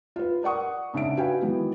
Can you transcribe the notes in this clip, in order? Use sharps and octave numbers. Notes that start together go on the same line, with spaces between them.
F4 B4
A#4 D5 F#5 C#6 D#6
G#2 C#3 D4 E5 D7
F#4 B4 F5 G5 G#5
D#3 E3 F#3 G#3 B3